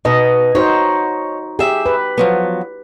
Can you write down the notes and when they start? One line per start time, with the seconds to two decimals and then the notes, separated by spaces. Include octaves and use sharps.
0.05 B2 B3 D#4 D#5
0.55 D#4 F#4 C5 C#5
1.59 G4 G#4 E5
1.86 B4
2.18 F3 F#3 B3